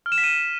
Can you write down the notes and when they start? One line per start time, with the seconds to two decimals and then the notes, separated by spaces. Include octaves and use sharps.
0.06 F6
0.12 E7
0.18 B6
0.24 D#7